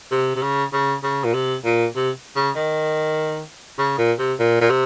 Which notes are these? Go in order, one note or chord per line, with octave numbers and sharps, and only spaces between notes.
C3
C3
C#3
C#3
C#3
A#2
C3
A#2
C3
C#3
D#3
C#3
A#2
C3
A#2
A#2
C3